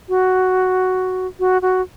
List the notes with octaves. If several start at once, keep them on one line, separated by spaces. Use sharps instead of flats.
F#4
F#4
F#4